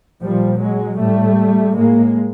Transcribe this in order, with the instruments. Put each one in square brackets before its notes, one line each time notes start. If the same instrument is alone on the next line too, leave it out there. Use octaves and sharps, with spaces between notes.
[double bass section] A#2 F3 G3
F#3 G#3
A2 G3 A3
A2 G#3 A#3